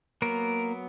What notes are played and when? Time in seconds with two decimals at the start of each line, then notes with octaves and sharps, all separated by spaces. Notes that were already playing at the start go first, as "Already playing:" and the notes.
0.22 F#3 A#3 B3 A#4